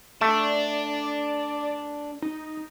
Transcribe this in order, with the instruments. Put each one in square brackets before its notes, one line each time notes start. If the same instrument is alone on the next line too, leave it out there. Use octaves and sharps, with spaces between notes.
[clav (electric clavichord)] A3 [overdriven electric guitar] D4 [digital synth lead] D5
[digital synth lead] D#4